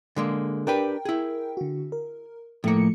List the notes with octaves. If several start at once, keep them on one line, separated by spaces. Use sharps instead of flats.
D3 G#3 A#3
D4 G4 A#4 B4 G5
E4 G#4
D3 F#4
A#4
A2 F3 A3 A#3 C#7